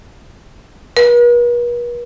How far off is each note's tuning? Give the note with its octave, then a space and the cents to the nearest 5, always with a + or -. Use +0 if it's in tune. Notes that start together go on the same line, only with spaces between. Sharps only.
B4 -45